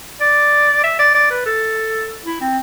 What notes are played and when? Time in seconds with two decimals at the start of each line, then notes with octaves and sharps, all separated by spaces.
0.21 D5
0.84 E5
0.99 D5
1.15 D5
1.31 B4
1.46 A4
2.25 E4
2.41 C4